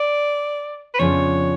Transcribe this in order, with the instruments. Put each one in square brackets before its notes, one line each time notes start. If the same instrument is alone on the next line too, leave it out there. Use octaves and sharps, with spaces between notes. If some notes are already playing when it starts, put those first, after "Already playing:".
Already playing: [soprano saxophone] D5
B4
[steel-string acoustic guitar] F2 C#3 F3 B3 D4 [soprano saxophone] C#5